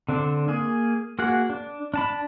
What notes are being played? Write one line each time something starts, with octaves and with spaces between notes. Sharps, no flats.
D3 C4 D4
A#3 G#4
A#3 F#4 G#4 F#5
D4
D4 A5 B5